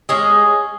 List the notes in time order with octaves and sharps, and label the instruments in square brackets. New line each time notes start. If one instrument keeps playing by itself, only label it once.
[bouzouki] G#3 C#4 G#4